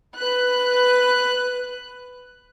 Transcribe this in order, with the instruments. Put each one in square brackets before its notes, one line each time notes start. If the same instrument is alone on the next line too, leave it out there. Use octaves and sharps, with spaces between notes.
[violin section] B4 F#6